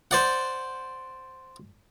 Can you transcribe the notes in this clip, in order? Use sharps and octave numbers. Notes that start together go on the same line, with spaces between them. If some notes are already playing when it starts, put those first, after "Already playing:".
C5 D5 F#5